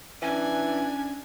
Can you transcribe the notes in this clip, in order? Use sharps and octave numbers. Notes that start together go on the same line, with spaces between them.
E3 C#4 D4 G#5